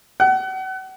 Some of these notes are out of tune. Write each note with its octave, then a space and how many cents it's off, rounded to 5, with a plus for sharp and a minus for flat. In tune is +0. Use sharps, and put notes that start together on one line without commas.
F#5 +35